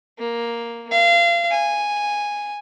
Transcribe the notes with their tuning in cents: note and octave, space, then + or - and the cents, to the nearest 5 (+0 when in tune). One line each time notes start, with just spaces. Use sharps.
A#3 +5
F5 -30
G#5 -5